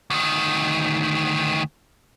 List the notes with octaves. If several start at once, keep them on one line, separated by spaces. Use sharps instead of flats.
D2 D#3